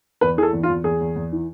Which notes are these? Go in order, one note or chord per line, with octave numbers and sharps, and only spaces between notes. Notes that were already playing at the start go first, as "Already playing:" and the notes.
E2 B4
E3 G#4
A4
E2
F4
E2
E2 G#4
E2
E2
E3